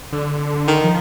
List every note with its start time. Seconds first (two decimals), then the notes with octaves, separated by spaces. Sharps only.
0.12 D3
0.68 D#3
0.84 F3